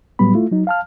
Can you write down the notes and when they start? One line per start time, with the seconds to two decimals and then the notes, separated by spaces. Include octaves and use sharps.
0.19 A2 F#3 G3 B3 B5
0.35 A3 E4 F4
0.51 F#3 D#4
0.67 F5 A5 F6